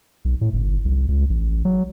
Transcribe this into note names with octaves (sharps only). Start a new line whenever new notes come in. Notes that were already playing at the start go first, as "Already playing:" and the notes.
B1
A2
G1
C2
C#2
A1
F#3